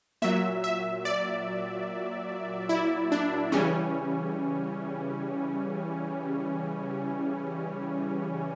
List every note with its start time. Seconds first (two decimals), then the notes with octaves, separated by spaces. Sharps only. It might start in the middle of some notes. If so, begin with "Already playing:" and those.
0.22 A#2 F#3 E5
0.64 E5
1.05 D5
2.69 E4
3.12 D4
3.52 C#3 E3 G3 C#4